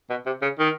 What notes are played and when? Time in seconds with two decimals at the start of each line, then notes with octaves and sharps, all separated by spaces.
0.10 B2
0.26 C3
0.42 C#3
0.59 D#3